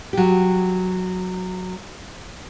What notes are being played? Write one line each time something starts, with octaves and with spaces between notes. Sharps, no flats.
F#3 G4